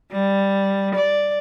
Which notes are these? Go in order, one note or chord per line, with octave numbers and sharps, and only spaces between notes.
G3
D5